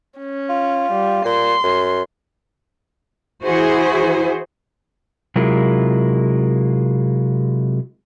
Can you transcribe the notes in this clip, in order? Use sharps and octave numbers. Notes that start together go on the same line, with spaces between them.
C#4
F4
G3
A#2 C6
F#2
E3 E4 F#4 G#4 C5
C3 F#3 G#3 E4 F4 A#4